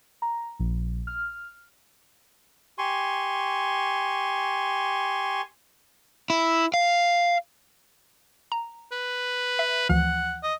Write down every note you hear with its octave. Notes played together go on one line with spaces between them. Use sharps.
A#5
A#1
F6
G4 G#5 C6 C#6
E4
F5
A#5
B4
E5
D2 E3 F3 F#5
D#5